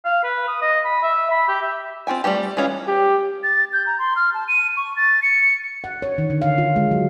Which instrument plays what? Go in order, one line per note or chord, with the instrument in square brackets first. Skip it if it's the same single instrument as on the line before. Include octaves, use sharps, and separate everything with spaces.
[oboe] F5
B4
D#6
D#5
B5
E5
B5
G4
E5
[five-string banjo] C4 F4 G5 G#5
G3 A3 A#3 G4
E3 G#3 C#4 F4
[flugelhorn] G4
[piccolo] A6
G6
A#5
C6
F6
A5
D#7
C#6
A6
C#7
[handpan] F#5
C#5
D#3
D3
F5
F4
G#3
F#3